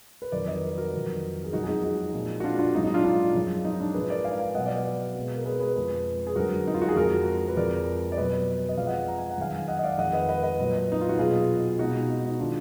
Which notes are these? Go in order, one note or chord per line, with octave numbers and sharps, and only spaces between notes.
B4
F2 D#3 F#3 A#4 D5
B4 D#5
A#4 D5
F#4 A#4
F2 D#3 F#3
G#4
F#2 F3 G#3 D#4 F#4
G#4
D#4 F#4
D#4
A#2 F3 G#3
F#4
D4 F4
D4 F4
G#2 F#3 D#4
D#4
D4 F4
D4 F4
F#2 F3 G#3
D#4
D4
G#2 F3 G#3 G#4 B4
A#4 D5
F5 G#5
F5 G#5
B2 F#3 D#5 F#5
D5 F5
B4 D#5
B2 G#3
A#4
G#4 B4
G#4 B4
F2 F3 G#3
G#4
F#2 D3 G#3 F#4 A#4
D#4
F4
F#4
G#4
F2 F3 G#3 F#4 A#4
B4
F2 F3 G#3 A#4 D5
D5
B2 F#3 B4 D#5
D#5
F2 F3 G#3 D5 F5
D#5 F#5
A#5
G#5
F#5
F#2 D#3 G#3 F5 G#5
D#5 F#5
D#5
D5 F5
F2 D#3 G#3 D#5 F#5
B4 D#5
B4 D#5
B4 D#5
A#2 F#3
D#4
F4
F#4
B2 F#3 F4 G#4
B2 G#3 D#4 F#4
D#4
D#4
D#3 G#3 D4 F4